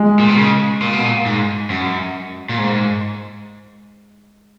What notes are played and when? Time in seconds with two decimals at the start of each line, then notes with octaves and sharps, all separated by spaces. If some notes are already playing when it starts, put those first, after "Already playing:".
Already playing: G#3
0.19 A#2
0.28 B2
0.38 C#3
0.82 A#2
0.93 B2
1.05 A#2
1.26 G#2
1.70 F#2
2.49 A#2
2.58 G#2